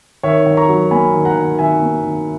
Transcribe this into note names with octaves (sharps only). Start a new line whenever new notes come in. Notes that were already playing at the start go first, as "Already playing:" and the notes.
D#3 C#5 E5
D#3
A#5 C#6
F#3
A#3 G#5 B5
D#3
F#5 A#5
D#3
D#3 E5 G#5
A#3
D#3